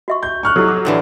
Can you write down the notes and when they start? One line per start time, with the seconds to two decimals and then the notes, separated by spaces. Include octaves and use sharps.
0.08 F#4 E5 C#6
0.23 G6
0.43 C#6 F6 F#6
0.56 F#3 E4 G4 A4
0.68 D6
0.85 A2 D3 E3